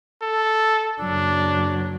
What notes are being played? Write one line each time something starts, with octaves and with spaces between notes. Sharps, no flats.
A4
F#1 F#3 D4